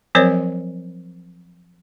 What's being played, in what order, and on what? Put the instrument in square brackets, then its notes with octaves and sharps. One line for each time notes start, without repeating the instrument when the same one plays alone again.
[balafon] F3 F#3 C4 A#4 C5 C#5